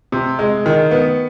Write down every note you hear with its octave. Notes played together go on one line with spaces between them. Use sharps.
C3
G#3
D#3
B3